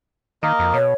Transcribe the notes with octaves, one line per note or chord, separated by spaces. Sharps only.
D#3 A#3 A#4 D#5
F2
B2 C#5